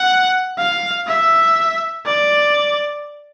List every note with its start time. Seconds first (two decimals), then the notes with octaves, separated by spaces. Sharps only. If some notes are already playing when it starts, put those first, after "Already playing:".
Already playing: F#5
0.58 F5
1.07 E5
2.06 D5